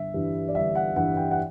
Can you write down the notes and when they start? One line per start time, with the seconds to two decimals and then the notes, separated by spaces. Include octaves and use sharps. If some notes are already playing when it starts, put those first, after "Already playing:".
Already playing: G1 E5
0.14 G2 E3 G3
0.48 D5
0.55 G1 E5
0.75 F#5
0.96 G2 E3 G3 F#5
1.17 G5
1.31 F#5